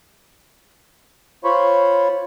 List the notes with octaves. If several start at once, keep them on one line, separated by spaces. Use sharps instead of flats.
F4 C5 C#5 B5 C#6